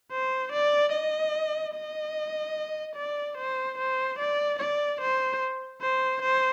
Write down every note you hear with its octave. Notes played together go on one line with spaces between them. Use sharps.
C5
D5
D#5
D#5
D5
C5
C5
D5
D5
C5
C5
C5